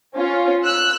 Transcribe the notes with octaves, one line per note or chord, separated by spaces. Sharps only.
C#4 F4
E6 F#6